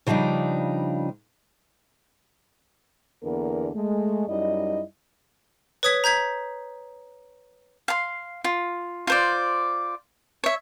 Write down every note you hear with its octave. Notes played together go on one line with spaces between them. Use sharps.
C#3 F3 G3 D4 D#4
E2 D3 A#3 B3 A#4
G#3 A3
F#2 G3 D#4 E4 D#5
B4 C#5 D#6 G#6 B6
A#5 G6 G#6 B6
F5 C6
F4
F4 C5 D5
C#5 E5